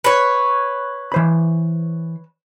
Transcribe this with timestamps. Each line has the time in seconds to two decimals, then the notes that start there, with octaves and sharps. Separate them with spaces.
0.04 B4 C#5
1.12 E3 C5 B5